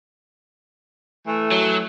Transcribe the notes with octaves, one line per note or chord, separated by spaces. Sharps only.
E3 A3
F#3